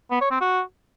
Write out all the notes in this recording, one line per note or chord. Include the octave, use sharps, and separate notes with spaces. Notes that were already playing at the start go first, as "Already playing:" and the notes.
B3
C#5
C4
F#4